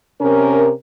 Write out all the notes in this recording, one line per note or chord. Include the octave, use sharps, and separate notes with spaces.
C3 C#4 A#4